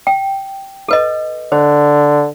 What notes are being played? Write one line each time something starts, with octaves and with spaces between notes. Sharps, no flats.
G5
A4 B4 D#5
D3 C5